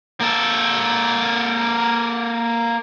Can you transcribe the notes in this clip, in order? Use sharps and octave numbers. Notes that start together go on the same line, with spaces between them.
A#3 A4